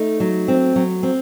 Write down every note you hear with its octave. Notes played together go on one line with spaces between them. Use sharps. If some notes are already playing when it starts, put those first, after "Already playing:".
Already playing: A3 D#4
F#3
C4
F#3
C4